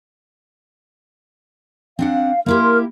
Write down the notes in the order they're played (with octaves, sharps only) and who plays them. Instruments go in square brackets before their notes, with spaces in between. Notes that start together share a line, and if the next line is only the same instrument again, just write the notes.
[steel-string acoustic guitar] C4 D4 F#5 [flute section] F5
[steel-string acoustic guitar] A#3 E4 G4 [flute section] A#4 C6 F6